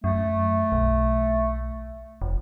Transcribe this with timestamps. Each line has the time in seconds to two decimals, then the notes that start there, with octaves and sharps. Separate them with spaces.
0.04 F#2 A3
0.72 B1
2.22 F1